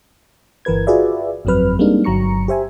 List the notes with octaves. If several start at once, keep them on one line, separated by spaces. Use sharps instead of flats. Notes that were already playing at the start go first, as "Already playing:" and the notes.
G1 E3 A#4 B4 G#6
F4 F#4 G#4 B4 D5 E5
G1 F2 F#3 C4 B4 F6
G3 G#3 A#3 C4 D4 D#4
G1 F#3 A#5 C#6 C#7
G4 C5 E5 G#5